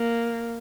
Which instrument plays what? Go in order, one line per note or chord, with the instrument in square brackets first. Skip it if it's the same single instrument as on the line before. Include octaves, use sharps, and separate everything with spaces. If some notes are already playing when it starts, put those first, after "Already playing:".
Already playing: [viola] A#3